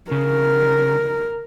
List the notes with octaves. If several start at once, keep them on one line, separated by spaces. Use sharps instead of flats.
C#3 A#4